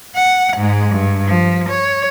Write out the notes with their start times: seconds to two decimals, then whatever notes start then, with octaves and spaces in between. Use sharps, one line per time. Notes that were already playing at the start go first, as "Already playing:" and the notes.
0.15 F#5
0.57 G#2 G#3
0.90 G2
1.27 F3
1.69 C#5